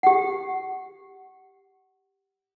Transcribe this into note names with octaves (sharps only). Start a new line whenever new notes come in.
G4 F#5